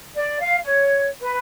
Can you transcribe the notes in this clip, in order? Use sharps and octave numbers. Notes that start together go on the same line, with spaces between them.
D5
F5
C#5
B4